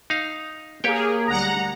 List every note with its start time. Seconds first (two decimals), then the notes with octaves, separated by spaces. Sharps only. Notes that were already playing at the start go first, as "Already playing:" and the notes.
0.10 D#4 F5
0.84 A#3 G4 G#4 C#5 G5
1.27 D2 G3 F#5 A#5